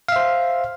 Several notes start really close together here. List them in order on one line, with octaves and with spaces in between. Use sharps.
F5 E5 C5